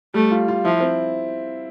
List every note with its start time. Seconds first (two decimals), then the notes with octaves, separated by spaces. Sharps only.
0.14 G3 A3
0.31 F4
0.48 F4
0.65 F3 E4
0.80 C4